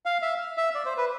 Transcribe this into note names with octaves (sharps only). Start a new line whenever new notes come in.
F5
E5
E5
D5
C5
B4